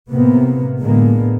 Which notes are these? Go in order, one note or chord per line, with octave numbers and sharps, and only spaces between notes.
A2 C3 A#3 B3
A2 D3 G#3 A#3 B3